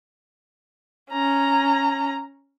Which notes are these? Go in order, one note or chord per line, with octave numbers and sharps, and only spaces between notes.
C#4 A#5